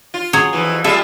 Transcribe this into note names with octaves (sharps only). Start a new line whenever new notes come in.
F4
F#3 G#4 C#5
F2 C#3 E3
G3 F4 A4 E5